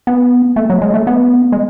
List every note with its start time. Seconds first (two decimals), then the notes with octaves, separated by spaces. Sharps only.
0.07 B3
0.56 A3
0.70 F#3
0.82 G#3
0.94 A3
1.07 B3
1.52 G#3